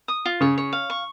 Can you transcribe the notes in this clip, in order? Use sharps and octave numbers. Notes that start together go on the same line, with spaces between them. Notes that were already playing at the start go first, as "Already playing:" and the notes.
D#6
F4
C#3 C#5
C#5
F5
C#6